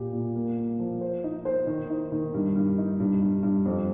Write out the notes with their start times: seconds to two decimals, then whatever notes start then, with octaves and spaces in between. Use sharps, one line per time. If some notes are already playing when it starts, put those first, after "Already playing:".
Already playing: A#2 G4
0.13 A#2
0.35 A#3
0.57 A#3
0.79 F3
1.01 C5
1.24 D#4
1.45 C5
1.67 D#3
1.90 D#4
2.12 D#3
2.34 G2
2.55 G2
2.78 D#4
3.00 G2
3.21 G2
3.43 G2
3.65 F2